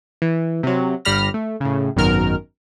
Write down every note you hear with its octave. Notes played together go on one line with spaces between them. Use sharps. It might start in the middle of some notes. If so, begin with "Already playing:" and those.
E3
C3 F#3
G1 G3 B5 F6 A#6
A3
A2 C#3
G#1 F#2 B2 D#3 A#4 F6